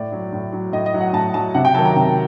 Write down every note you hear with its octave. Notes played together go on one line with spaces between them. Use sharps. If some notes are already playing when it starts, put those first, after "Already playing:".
Already playing: A2 D5
F#3
A2
F#3
A2 D#5
D#5
F#3
F#5
A2 A5
F#3 A5
C3 F#5
G5
D#3 F#3 A5
A#5
C3